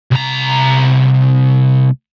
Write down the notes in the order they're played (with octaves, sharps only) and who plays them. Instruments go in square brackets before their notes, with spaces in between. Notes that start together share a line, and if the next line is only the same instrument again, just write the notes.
[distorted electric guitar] C2 A#5